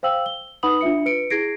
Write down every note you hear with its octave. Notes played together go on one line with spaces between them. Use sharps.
C5 F5 G5 E6 F#7
G7
D#4 B4 F#5 B5 D#6 F#7
D4 F4 E5 C#7
B4 C#7 D7
E4 G#4 G#6 A#6 C7 D7